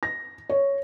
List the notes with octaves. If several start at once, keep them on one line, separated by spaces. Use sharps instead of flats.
A#6
C#5